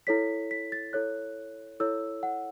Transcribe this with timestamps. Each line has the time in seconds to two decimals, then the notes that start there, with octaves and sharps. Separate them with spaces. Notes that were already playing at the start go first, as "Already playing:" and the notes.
0.07 E4 A4 C#5 B6
0.51 B6
0.72 A6
0.93 E4 A4 C#5 F#6
1.80 E4 A4 C#5 E6
2.23 F#5